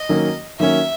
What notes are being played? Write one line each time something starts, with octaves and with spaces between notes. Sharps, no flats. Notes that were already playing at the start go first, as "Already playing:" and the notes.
Already playing: D#5
D#3 F#3 A#3 C#4
D#3 F#3 A#3 C#4 E5